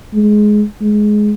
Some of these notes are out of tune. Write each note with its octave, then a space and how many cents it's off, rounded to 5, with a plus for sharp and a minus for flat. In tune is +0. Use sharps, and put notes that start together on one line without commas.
G#3 +15
G#3 +15